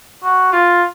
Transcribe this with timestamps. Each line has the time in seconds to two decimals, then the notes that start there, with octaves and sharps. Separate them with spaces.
0.24 F#4
0.53 F4